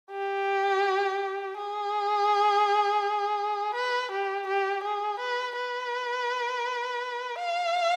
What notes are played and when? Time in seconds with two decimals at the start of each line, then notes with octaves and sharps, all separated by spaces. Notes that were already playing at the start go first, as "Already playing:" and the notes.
0.11 G4
1.57 G#4
3.75 B4
4.12 G4
4.47 G4
4.84 G#4
5.20 B4
5.56 B4
7.38 F5